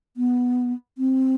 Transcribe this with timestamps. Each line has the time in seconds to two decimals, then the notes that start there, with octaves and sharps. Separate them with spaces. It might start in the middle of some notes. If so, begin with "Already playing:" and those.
0.17 B3
0.98 C4